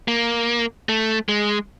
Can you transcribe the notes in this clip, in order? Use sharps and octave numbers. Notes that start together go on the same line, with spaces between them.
A#3
A3
G#3